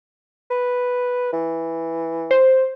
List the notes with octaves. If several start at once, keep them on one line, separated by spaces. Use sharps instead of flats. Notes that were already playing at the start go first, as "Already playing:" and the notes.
B4
E3
C5